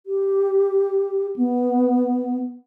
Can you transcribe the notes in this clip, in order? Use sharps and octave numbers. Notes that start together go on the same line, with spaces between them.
G4
B3